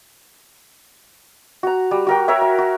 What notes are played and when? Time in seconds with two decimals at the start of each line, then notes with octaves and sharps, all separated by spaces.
1.63 F#4 A#5
1.91 G3
2.07 F#4 A#4 G5
2.28 A#4 C#5 E5
2.41 E5
2.58 F#4